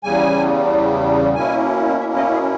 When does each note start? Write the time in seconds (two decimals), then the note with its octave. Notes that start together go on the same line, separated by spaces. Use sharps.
0.04 E2 C#3 G3 G#5
1.35 B2 A#3 C#4 E4 G#5
2.00 E5
2.17 D#5
2.33 G#4